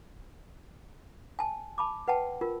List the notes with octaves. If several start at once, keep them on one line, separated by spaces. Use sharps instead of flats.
G#5 A5
A5 B5 D6
B4 F#5 G5 A5
F4 A#4